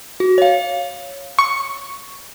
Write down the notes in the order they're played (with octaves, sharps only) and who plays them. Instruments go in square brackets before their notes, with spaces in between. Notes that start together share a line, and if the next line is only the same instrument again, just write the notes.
[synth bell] F#4
C#5 F5
[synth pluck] C#6